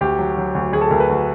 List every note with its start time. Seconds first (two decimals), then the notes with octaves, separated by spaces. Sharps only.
0.01 D2 G4
0.19 F#3
0.38 F#3
0.55 D2
0.72 D2 G#4
0.81 A4
0.90 D2 A#4
1.00 B4
1.09 D2